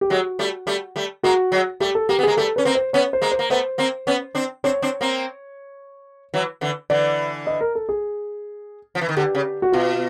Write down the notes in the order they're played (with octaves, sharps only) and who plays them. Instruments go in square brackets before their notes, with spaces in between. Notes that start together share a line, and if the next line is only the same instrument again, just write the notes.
[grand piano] G4
[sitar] F#3 G#3 [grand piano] F#4
[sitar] G3 A3
G3 A3
G3 A3
[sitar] G#3 A#3 [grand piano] F#4
[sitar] F#3 G#3
[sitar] G3 A3 [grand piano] G4
[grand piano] A4
[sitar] A#3 [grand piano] G4
[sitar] B3
[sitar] G#3 A#3 [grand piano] G#4
[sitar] G3 A3 [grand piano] A4
[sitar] C#4 [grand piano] B4
[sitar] A#3 C4
[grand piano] C5
[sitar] B3 C#4 [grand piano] C#5
[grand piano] C5
[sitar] G#3 A#3
[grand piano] C5
[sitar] A#3
[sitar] A3 B3 [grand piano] C5
[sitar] A#3 C4
B3 C#4
C4 D4
[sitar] C4 D4 [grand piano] C#5
[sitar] C4 D4
A#3 C4
E3 F#3
D3 E3
[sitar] D3 E3 [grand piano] D5
[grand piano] D#5
A#4
A4
G#4
[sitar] F3
E3
D#3
[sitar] D3 [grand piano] G4
[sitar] C#3
[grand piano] F#4
[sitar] B2 [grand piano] F4